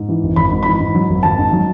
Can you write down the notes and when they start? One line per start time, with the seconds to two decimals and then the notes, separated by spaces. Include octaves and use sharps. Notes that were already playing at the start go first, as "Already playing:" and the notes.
Already playing: G#2
0.09 E3
0.23 G#1
0.36 G#1 B5
0.51 G#2
0.63 E3 B5
0.80 G#2
0.95 F#3
1.09 G#1
1.23 G#1 A5
1.38 G#2
1.53 F#3